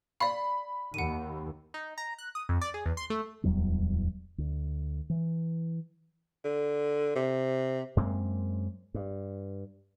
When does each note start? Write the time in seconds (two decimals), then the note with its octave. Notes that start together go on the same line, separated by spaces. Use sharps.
0.20 D5 F5 B5
0.94 D#2 F#5 D#7
1.74 D#4
1.98 A#5
2.18 F#6
2.35 D#6
2.49 F2
2.61 D5
2.74 G#4
2.86 E2
2.97 C6
3.10 A3
3.43 D1 E2 F#3 G3
4.38 D2
5.10 E3
6.44 D3
7.15 C3
7.97 F#2 G#3 A#3 C4
8.94 G2